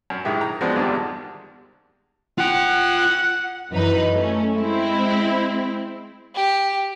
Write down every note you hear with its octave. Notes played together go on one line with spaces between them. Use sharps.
F#2
G#2 D#3 G#3 E4 G4
A#5
F3 G#3 B3 C4 D4 F#4
E2 G2 D3 D#3 G3 G#3
F4 F#5 G5
F#2 E3 D#4 B4
A3 C#4
G#3 C4 E4
G4